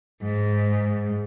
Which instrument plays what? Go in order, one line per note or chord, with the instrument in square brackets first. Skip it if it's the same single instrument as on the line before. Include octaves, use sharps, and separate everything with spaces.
[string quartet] G#2